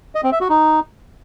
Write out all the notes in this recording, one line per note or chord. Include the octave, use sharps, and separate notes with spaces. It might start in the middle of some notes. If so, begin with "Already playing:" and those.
D#5
C4
E5
F#4
D#4